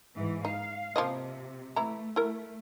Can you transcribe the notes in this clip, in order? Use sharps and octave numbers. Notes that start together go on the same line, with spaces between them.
G#2 E3
D#4 F5
C3 F3 A#3 D#5
E3 A3 E4 A#5
A3 E4 A#4